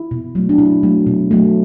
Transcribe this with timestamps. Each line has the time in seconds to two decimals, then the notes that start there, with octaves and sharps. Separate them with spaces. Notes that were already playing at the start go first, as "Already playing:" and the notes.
Already playing: E4
0.11 B2
0.35 F#3 A3
0.49 D4
0.58 B2 E4
0.83 F#3 A3
1.07 B2
1.31 F#3 A3